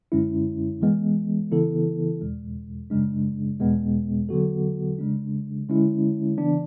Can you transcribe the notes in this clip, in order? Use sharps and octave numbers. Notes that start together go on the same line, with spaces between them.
F#2 D3 G#3 C#4 E4
E3 G#3 B3
C#3 E3 B3 E4 A4
E2 B2 G#3
F#2 C#3 G#3 D4
E2 B2 G#3 B3
D3 F#3 B3 F#4 A4
C#3 G#3 D4
D3 G#3 C#4 E4
C#3 E3 B3 D4